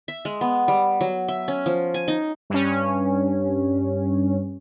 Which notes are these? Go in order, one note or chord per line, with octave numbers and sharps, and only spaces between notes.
E5
G#3
B3
G3
F#3
E5
C#4
F3
G#5
D#4
G2 C#4